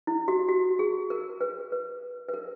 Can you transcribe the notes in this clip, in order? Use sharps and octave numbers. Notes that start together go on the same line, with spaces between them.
E4
F#4
F#4
G#4
A#4
B4
B4
B4
A#4